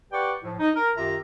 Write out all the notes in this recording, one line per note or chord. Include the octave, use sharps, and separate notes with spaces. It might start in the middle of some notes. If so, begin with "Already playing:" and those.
G4 B4 D5 F#5 G5 C#6
A2 F3
D#4
A#4
F#2 D#3 F4 G4 E5 A#5